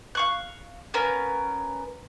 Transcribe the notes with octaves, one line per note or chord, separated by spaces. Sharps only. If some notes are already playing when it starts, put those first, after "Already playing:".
F5 C#6 F#6
B3 C#4 A#4 B4